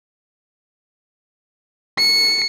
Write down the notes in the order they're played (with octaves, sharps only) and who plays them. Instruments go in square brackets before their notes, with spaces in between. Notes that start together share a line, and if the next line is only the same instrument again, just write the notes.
[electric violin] C#7